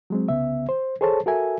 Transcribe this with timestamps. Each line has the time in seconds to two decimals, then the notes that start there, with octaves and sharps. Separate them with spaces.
0.10 F#3 G#3 C4
0.29 C2 C#3 B3 E5
0.69 C5
1.01 G#4 A4 C5 C#5 A5
1.26 F#4 A4 A#4 E5 G#5